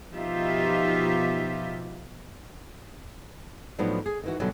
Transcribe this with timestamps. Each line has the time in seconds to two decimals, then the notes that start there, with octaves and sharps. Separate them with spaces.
0.13 B2 F3 D#4 F4 G4 E5
3.79 A2 F3 F#3 B3 D4 D#4
4.06 G#4
4.24 D#3 E3 F#4
4.40 B2 D3 E3 F#3 G3